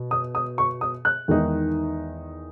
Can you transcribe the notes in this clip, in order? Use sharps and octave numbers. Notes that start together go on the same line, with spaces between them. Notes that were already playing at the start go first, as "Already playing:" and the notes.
Already playing: B2
D#6
D#6
C#6
D#6
F#6
E2 D#3 G#3 D#4